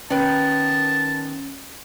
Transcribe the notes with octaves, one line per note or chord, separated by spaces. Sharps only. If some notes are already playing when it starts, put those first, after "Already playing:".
D#3 B3 C#4 A#4 A5